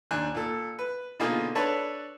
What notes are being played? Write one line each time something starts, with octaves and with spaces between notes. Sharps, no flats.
D#2 D4 G#5 F#6
A#2 A4
B4
B2 D3 A#3 D#4 F4 G#4
D4 A4 B4 C#5 A5 B5